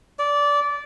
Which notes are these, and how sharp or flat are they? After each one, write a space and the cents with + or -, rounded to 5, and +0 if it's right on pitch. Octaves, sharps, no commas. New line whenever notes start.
D5 -20